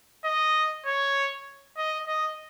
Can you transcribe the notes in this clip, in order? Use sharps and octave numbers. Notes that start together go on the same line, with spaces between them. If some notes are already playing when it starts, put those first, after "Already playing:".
D#5
C#5
D#5
D#5